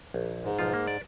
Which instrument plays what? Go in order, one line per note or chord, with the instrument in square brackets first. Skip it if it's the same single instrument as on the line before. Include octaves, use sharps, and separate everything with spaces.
[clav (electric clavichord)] A#1
[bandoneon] G#2
[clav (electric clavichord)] B1 F3 F4
A#3
D5